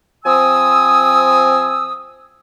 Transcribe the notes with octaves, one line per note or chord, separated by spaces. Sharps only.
F3 C4 G#5 D#6 E6